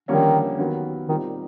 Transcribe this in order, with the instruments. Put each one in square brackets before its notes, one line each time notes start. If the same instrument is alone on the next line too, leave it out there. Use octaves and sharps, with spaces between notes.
[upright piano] F2 D3 G3 A#3 C#4 [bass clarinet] D#3
[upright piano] D#2 D#3 F#3 B3
[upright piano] A#2 G3 C4 D#4 [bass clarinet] D#3